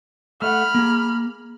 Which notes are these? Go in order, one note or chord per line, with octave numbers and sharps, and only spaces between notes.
A3 E5 F#5 B5 F6
A#3 G#4